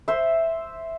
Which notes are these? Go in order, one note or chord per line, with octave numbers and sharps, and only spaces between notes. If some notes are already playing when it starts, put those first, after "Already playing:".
C5 E5